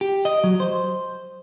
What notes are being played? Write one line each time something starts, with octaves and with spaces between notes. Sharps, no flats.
G4
D#5
F#3
C5